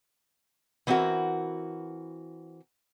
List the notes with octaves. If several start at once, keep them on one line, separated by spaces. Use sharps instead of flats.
E3 B3 C4 E4 F#4 A#4